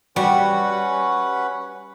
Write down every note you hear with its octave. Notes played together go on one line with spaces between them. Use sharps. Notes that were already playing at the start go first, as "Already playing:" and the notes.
G3 C#4 F#4 B4 F#5